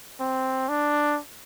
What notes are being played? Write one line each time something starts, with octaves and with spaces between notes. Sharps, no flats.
C4
D4